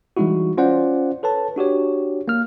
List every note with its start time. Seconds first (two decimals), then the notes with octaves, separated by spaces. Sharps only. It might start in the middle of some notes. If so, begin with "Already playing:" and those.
0.17 E3 G3 G#3 D#4 E4 F#4
0.58 C#4 F4 C5 D5 F#5
1.23 A4 B4 C#5 A5
1.56 D4 F#4 G4 C#5
2.28 A#3 F6